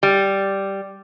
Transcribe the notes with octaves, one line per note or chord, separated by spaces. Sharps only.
G3